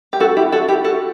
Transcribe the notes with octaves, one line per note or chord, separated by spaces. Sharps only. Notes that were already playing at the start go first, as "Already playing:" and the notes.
G4
F#4 A4
E4 G4
F#4 A4
E4 G4
F#4 A4